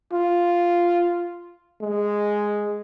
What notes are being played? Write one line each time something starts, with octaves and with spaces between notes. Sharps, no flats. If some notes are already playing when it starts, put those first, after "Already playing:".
F4
G#3